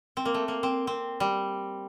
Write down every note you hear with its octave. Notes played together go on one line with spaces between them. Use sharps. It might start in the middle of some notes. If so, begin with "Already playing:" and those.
C4
A#3
A3
A#3
C4
C4
G3